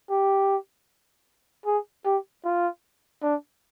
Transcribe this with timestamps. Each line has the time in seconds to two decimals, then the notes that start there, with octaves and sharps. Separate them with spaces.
0.10 G4
1.66 G#4
2.05 G4
2.45 F4
3.23 D4